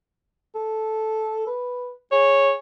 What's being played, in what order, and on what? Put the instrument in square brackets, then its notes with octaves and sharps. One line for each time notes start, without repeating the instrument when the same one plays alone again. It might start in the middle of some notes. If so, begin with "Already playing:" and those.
[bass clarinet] A4
B4
[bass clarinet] G#4 [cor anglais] C#5